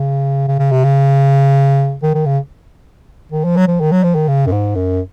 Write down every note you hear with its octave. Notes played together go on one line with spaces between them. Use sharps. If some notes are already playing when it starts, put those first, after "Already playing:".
Already playing: C#3
C#3
C#3
C3
C#3
D#3
D#3
C#3
D#3
F3
F#3
F3
D#3
F#3
F3
D#3
C#3
F#2
G#2
F#2